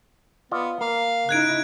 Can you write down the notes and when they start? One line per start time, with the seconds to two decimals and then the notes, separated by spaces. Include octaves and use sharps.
0.51 B3 F4 D5 D#5
0.81 A#3 F5
1.29 C#3 D#4 E4 F#6 G#6 D7